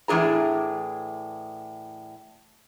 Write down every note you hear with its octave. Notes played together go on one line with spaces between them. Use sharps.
A2 E3 D4 G#4 A#5